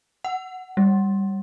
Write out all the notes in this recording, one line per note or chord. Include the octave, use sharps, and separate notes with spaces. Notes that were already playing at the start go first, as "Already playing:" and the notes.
F#5
G3